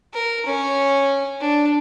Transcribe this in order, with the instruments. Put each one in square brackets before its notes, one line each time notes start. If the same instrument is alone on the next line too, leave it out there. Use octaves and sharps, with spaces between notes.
[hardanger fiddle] A#4
C#4
D4